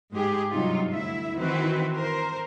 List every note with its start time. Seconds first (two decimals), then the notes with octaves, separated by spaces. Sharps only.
0.13 G#2 G#3 G4 G#4
0.52 G2 C3 F#3 D#4 F4
0.91 D2 E4 E5
1.37 D#3 E3 C4 E4 F#4 B4
1.96 A#4 C5